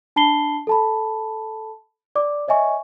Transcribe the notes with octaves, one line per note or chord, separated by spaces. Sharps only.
D4 A5 B5 C7 G7
A4 A5 B5
D5 D6
C#5 D#5 E5 G#5 C#6